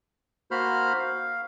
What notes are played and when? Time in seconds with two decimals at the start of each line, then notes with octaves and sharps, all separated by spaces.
0.51 A#3 F#4 C5 B5 F6
0.99 F5